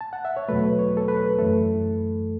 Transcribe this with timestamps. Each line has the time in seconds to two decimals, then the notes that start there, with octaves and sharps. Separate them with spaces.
0.01 A5
0.13 F#5
0.25 E5
0.37 C#5
0.49 E2 B2 F#3 A3 B4
0.79 C#5
0.97 A4
1.08 B4
1.38 F#2 E3 A3 A4